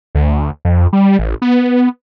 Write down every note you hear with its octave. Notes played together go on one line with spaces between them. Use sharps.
D2
F2
G3
A1
B3